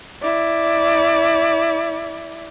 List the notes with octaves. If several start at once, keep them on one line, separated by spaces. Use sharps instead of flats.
E4 D5